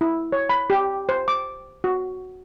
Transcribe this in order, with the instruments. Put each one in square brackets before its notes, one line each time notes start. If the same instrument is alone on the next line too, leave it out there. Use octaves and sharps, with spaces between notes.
[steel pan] E4
C#5
B5
G4
C5
D6
F#4